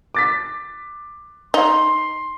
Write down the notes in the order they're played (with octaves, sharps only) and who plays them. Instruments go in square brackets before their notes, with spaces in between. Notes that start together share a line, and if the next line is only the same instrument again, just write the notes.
[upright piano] D6 A6 B6
[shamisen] D#4 [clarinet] C6